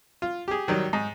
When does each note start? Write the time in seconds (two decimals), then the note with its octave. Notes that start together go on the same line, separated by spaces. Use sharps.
0.22 F4
0.48 G4 G#4
0.68 D#3 F#3 G3
0.93 G#2